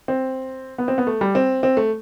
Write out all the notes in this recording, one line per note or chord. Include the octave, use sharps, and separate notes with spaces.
C4
B3
C4
B3
A3
G3
C4
C4
A3